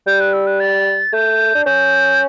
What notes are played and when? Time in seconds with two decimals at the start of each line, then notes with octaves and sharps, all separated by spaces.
0.07 G3 G6
0.20 F#6
0.33 E6
0.47 F#6
0.60 A6
1.13 A3 G6
1.55 D4
1.66 C#4 G6